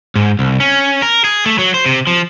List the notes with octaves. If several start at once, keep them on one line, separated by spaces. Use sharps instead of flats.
G#2
C2
C#4
A#4
G#4
A3
F#3
C5
C3
F3